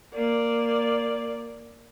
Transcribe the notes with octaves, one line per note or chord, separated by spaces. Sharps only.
A#3 D5